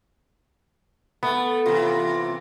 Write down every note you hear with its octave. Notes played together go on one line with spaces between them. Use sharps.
A3 B3
C3 E3 F4